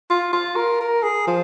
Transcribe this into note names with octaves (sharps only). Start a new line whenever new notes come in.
F4
F4
A#4
A#4
G#4
F3